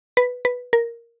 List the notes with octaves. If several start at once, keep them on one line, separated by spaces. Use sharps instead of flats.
B4
B4
A#4